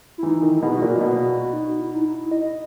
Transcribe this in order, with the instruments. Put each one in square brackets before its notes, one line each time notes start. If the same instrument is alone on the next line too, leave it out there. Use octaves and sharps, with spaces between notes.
[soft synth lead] E4
[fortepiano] E3 [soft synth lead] D#4
[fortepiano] D#3
[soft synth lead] E4
[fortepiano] B2 [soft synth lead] G#4
[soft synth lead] F#4
[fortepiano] A#2
[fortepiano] B2 [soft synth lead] F#4
[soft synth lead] F#4
D#4
E4
D#4
E4
D#5